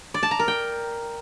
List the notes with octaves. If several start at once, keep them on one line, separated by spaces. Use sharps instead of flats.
D5
A5
A#5
A#4
G5